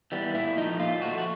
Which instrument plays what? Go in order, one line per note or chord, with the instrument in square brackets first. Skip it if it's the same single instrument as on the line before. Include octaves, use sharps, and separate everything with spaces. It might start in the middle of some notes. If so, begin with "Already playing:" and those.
[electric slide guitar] E3 G3 B3
A#2 E4
F3 A3 D#4
A#2 F4
F3 A3 F#4
F#4